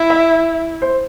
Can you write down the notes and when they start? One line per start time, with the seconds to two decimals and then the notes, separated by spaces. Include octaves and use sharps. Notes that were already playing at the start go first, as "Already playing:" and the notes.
Already playing: E4
0.10 E5
0.82 C5